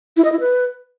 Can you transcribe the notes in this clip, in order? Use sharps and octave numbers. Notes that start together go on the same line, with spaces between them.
E4
D#5
E4
B4